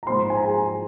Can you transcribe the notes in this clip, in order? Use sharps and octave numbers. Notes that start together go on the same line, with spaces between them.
A#5
G#2 F3 A#3 D#4 C5 C6
G#5
A#5
G#4 G#5